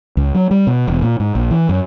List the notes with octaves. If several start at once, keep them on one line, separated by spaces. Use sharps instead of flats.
C#2
F#3
G3
B2
E1
A#2
G#2
A#1
E3
F#2